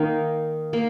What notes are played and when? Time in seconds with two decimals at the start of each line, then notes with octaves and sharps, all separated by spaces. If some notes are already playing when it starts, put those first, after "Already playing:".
Already playing: D#3 A#3 D#4
0.73 A#3